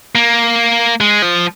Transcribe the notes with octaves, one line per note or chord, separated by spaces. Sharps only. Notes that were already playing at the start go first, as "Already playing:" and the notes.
A#3
G#3
F3